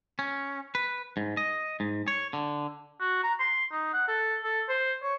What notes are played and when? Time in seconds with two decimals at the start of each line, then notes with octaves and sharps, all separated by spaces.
0.19 C#4
0.75 B4
1.17 G#2
1.37 D#5
1.80 G#2
2.08 C#5
2.33 D3
3.00 F#4
3.24 A#5
3.40 C6
3.71 D#4
3.94 F#5
4.08 A4
4.43 A4
4.69 C5
5.03 C#5